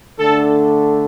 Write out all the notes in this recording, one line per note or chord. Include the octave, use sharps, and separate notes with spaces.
D3 A3 D4 A4